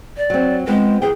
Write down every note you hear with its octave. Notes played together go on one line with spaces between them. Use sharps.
D5
F#3 C4
F3 G#3 B3 C4
F#2 E3 G#4 G5